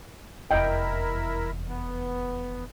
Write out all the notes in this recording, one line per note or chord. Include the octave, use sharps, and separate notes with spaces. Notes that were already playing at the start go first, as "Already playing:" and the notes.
F1 E2 E4 A#4 D#5 E5 G5
B3